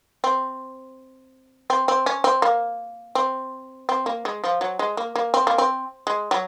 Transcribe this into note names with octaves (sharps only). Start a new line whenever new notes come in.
C4
C4
C4
C#4
C4
A#3
C4
C4
A#3
G#3
F3
F#3
G#3
A#3
A#3
C4
A#3
C4
G#3
F#3